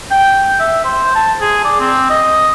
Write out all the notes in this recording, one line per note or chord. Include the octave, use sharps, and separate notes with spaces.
G5
E5
C5
A5
G#4
D5
C4
D#5